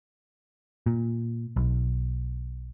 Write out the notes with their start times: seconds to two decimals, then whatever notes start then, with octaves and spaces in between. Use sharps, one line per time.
0.86 A#2
1.56 B1